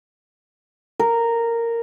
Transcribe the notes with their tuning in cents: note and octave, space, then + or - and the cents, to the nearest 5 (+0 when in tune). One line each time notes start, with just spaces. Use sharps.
A#4 -10